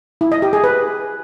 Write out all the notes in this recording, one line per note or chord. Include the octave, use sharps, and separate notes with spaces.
E4
D#5
G4
G#4
B4